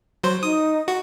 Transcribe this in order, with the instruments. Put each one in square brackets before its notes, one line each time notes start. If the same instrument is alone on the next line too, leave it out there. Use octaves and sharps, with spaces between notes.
[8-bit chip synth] F#3 C5
[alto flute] D#4 [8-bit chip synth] D#6
[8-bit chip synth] F#4